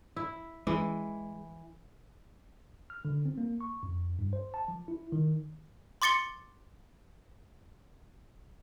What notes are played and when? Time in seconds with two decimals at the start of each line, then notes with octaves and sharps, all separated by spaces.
0.16 E4
0.67 E3 G#3
2.90 F6
3.05 D3
3.25 C4
3.38 A#3
3.61 C#6
3.83 F2
4.19 G2
4.33 C5
4.54 A5
4.68 F3
4.88 E4
5.12 D#3
6.02 C6 D6 A6 C#7 G7